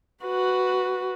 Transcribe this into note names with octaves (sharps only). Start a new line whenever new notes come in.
F#4 B4